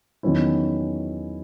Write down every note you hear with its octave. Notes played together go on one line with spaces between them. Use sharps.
E2 D#3 F#3 C#4 E4